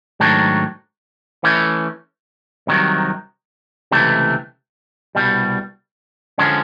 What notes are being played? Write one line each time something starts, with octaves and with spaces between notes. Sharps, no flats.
G#2 D#3 F#3 A3 D4
E3 A3 C#4
C2 C3 D#3 F#3
C#2 C3 E3 A3
C2 B2 G3
D3 F3 G#3 C#4